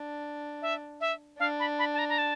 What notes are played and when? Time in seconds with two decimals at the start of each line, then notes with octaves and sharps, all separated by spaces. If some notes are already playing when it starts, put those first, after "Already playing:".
Already playing: D4
0.62 E5
1.01 E5
1.39 D4 F5
1.60 B5
1.79 B5
1.94 A5
1.99 A#5
2.09 A#5
2.18 A5